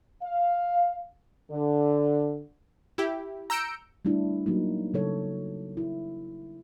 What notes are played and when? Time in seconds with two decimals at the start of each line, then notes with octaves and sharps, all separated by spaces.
0.23 F5
1.52 D3
2.98 E4 G4
3.50 A#5 E6 G6 C#7 D7
4.05 G3 A3 D4 E4
4.46 F#3 A#3 D#4
4.94 C#3 F#3 A4 C#5
5.77 E4